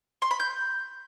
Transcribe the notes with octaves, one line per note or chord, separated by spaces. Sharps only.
C6
B5
G6